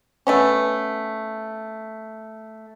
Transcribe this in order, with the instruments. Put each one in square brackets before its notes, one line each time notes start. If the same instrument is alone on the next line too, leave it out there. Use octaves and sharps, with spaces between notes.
[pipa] A3 B3 C#4